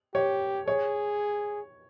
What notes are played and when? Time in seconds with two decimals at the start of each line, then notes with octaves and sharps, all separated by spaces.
0.14 G4 C#5
0.67 G#4 C#5